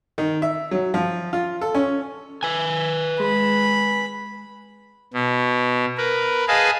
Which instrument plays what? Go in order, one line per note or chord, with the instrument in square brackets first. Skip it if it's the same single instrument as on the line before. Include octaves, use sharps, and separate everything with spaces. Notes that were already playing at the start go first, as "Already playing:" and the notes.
[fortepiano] D#3
E5
F#3
F3
F4
A4
C#4
[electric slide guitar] B4 G#5
[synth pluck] G#3 [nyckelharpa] B5
[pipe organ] B2
A#4 B4
G#4 B4 D#5 F5 G#5 A5